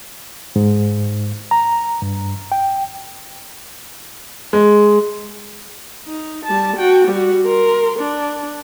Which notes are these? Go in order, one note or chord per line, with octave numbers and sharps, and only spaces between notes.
G#2
A#5
G2
G5
G#3
D#4
G3 A5
F#4 G5
G3 F#4
A#4 C6
D4